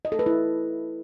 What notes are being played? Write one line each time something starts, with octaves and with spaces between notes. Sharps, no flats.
D#5
A4
B4
E4